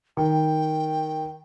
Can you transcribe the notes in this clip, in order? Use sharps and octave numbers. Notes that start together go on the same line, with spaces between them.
D#3 G5